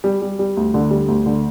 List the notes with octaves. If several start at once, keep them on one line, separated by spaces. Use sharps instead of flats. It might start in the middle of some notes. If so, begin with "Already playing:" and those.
G3
G3
G3
D2
D3
G3
D2
D3